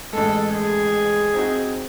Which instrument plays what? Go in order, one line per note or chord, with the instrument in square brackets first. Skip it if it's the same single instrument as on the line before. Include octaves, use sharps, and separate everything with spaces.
[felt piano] A1 G#3 [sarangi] A4
[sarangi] G#4
[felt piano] C4 D#4 F#4